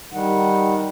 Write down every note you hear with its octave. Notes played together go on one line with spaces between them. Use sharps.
D#3 G3 F#5